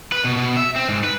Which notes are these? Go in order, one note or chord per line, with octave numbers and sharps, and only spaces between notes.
B4
B2
B2
E5
C4
G#2
B4